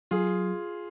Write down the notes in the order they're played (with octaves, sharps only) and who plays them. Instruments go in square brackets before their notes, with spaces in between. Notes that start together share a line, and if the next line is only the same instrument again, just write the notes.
[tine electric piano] F#3 [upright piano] F4 G#4